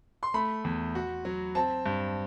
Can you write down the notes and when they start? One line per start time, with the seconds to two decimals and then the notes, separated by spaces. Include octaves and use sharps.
0.23 C6
0.34 A3 B5
0.64 E2
0.95 F#4
1.25 F#3
1.55 C4 A5
1.86 G2